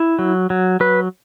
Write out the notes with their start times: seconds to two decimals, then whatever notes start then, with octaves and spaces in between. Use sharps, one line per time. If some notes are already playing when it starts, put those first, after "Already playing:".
Already playing: E4
0.19 F#3
0.50 F#3
0.80 F#3 B4